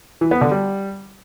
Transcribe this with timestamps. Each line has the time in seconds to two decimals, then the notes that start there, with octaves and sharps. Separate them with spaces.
0.21 E3
0.31 B3
0.41 D3
0.51 G3